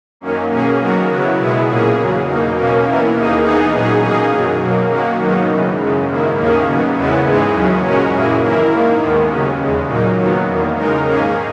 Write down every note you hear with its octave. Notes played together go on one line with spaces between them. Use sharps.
F#2 D#3 F#3 A#3 C#4
B2 A#3 C#4 G#4
D#3 F#3 B3 F#4 A#4
C#3 F#3 B3 E4
B2 G#3 B3 E4 G#4
A#2 A#3 C#4 G#4
E2 C#3 F#3
B2 A#3 D#4
B2 A#3 C#4
E3 B3 E4 A#4
D#2 D#3 A#3 D#4 G#4
E3 B3 D#4 G#4
A#2 F#3 C#4 G#4
B2 A#3 D#4 G#4
F#2 D#3 F#3
B2 F#3 A#3
D#3 A#3 C#4 F#4
G#2 D#3 F#3 B3 D#4
F#2 C#3 E3
F#2 C#3 G#3
G#2 D#3 A#3 E4
D#2 D#3 A#3 C#4 G#4
C#3 F#3 B3
E2 C#3 G#3 B3 E4
G#2 E3 G#3 D#4 G#4
D#2 C#3 F#3 C#4
A#2 G#3 C#4 F#4 A#4
F#2 E3 A#3 E4 G#4
D#3 A#3 E4 A#4
G#2 D#3 A#3
D#2 D#3 G#3 B3
D#2 C#3 F#3 C#4
E2 C#3 G#3
A#2 F#3 A#3 D#4
D#3 F#3 B3
E2 D#3 A#3
C#3 G#3 D#4 A#4
G#2 D#3 A#3 C#4 G#4